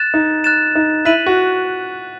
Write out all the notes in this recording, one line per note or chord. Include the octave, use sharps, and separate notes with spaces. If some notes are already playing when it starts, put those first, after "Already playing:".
Already playing: F#6 A6 E7
D#4
F#6 A6 E7
D#4
E4 F#6 B6 D#7 F#7
F#4